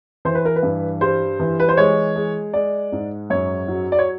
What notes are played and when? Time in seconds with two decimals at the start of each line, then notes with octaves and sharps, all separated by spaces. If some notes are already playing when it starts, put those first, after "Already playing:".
0.25 E3 C5
0.35 B4
0.45 A#4
0.56 B4
0.63 G2
1.01 G3 C5
1.40 E3
1.60 B4
1.69 C5
1.77 G#3 C#5
2.16 G#3
2.53 G#3 D5
2.92 G#2
3.30 F#2 C#5
3.68 F#3
3.92 D5
3.99 C#5